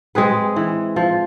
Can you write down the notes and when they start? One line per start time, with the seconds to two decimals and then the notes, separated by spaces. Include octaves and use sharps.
0.15 G#3 C4 G#4 B4
0.56 E3
0.96 F3